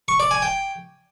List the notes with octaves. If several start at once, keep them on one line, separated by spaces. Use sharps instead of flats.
C#6
D5
G#5
G5